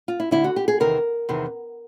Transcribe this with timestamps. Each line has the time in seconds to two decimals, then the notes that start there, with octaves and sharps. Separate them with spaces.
0.08 F4
0.20 E4
0.31 D2 D3 E4
0.44 F#4
0.56 G4
0.68 G#4
0.80 E2 C3 D#3 A#4
1.29 E2 C3 D#3